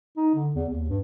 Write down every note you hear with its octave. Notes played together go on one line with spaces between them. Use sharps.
D#4
D3
E2
D#2
G2